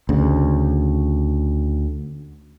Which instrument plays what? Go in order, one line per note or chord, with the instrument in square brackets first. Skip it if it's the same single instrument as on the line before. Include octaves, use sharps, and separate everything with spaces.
[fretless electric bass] D2 C#3